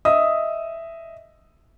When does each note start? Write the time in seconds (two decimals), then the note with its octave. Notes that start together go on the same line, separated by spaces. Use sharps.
0.05 D#5 E5 D#6